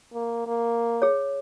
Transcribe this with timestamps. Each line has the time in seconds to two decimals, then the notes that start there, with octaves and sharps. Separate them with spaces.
0.14 A#3
0.47 A#3
1.02 G#4 C#5